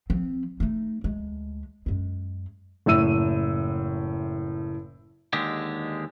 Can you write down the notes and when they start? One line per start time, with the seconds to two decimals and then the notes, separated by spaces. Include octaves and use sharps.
0.10 F3 C4
0.60 A3 D#4
1.04 D2 G#3
1.86 F#2 G#3
2.86 F#1 A2 E5 E6 D#7
5.33 D#2 D3 G#3 G4